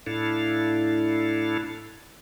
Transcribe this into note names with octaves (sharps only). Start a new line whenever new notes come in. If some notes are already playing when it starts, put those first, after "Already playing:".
A2 D4 E4 A4 F5